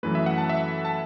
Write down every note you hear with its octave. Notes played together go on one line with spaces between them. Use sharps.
F#2 E3 A3 B4
E5
F#5
A5
E5
A5